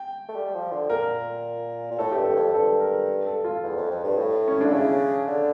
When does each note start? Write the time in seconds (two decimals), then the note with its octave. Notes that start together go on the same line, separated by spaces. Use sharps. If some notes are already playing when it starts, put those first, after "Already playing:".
Already playing: G5
0.28 A3
0.36 G3
0.54 F3
0.72 D3
0.90 A#2 A#4
1.91 A#2
1.99 A2 A4
2.12 G4
2.17 G2
2.24 A4
2.30 G2
2.36 F2
2.54 G2 A4
2.80 A#4
3.27 A4
3.44 F4
3.63 E2
3.77 F2
3.90 F2
4.04 G2
4.17 A2
4.48 C#4
4.61 D4
4.66 D3
4.71 C#3 E4
5.27 D3